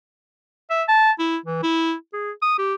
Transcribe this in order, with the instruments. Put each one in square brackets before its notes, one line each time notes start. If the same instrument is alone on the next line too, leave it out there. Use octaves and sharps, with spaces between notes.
[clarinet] E5
A5
E4
E3
E4
G#4
D#6
G4